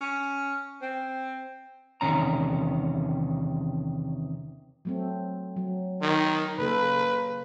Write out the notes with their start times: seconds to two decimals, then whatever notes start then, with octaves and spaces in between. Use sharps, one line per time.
0.01 C#4
0.82 C4
2.01 E2 C3 D#3 C#4 A#5
4.85 F#3 A3 C4
5.57 F#3
6.02 D#3
6.58 C#3 A#3 A4 B4